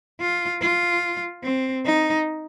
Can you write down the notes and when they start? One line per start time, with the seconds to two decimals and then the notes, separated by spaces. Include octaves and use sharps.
0.20 F4
0.61 F4
1.44 C4
1.85 D#4